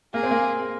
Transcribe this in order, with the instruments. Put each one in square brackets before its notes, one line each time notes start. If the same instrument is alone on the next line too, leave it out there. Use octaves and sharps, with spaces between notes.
[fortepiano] A#3 [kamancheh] G#4
[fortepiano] C4
A#3